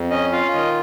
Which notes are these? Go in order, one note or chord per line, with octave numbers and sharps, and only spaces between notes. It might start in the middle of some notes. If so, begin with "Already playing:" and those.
Already playing: F2
C#4 D#5
F4 F5
D#3 D#5